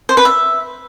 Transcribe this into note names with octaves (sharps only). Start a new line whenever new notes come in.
C5
B4
E5